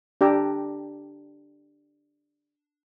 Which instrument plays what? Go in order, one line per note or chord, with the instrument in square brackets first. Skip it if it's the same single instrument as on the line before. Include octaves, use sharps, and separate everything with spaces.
[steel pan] D4 G4 G5 A#5 D6 E6